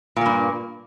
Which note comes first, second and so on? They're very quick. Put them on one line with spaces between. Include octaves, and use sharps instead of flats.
A#2 A#3 G2